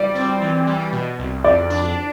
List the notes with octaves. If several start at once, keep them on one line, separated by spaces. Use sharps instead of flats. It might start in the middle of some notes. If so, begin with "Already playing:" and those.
Already playing: G3 D5
C4
E3
G3
B2
C2
F2 D5
D4